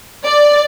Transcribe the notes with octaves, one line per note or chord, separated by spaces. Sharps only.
D5